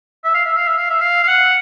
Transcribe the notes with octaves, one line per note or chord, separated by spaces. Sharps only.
E5
F5
E5
F5
E5
F5
E5
F5
F5
F#5